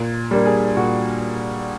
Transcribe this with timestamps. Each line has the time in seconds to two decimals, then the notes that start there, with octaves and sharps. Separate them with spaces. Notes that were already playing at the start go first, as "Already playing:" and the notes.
Already playing: A#2
0.31 G3 A#3 D4
0.46 G#4
0.77 A#2 F#4